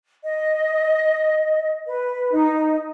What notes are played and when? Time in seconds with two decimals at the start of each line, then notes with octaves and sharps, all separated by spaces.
0.23 D#5
1.86 B4
2.31 D#4